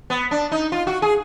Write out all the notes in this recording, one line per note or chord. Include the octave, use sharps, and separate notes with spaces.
B3
D4
D#4
F4
F#4
G#4